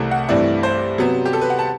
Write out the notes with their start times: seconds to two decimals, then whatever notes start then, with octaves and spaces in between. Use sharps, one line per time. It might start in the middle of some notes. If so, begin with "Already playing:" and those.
Already playing: C2 C3 E3 A3 C4 A4
0.11 F#5
0.28 G2 E3 A3 C4 E4 D5
0.63 C5
0.98 C3 F#3 B3
1.25 G4
1.33 A4
1.41 B4
1.50 F#5
1.59 A5